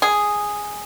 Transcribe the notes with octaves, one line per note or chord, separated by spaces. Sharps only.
G#4